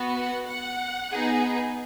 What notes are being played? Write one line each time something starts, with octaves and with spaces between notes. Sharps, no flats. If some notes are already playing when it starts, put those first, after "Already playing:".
Already playing: B3 F#4
F#5
F#5
B3 D#4 G#4